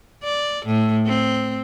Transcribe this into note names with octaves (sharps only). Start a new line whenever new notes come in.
D5
A2
C4